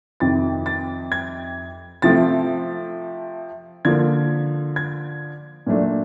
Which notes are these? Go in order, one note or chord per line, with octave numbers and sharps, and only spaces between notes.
F2 C3 D#3 A6
A6
G#6
C3 F3 A3 C4 A6
D3 F3 A#3 G#6
G#6
A#2 F#3 A3 D4